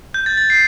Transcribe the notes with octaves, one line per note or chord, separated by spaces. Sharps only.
G6
A6
A6
C7